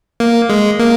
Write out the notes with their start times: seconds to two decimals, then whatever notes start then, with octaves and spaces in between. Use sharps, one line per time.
0.20 A#3
0.50 G#3
0.79 A#3